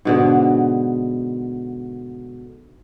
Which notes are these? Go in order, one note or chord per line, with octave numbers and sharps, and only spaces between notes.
G#2 B2 D3